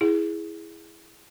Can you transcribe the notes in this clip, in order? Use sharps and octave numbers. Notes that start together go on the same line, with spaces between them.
E4 G#4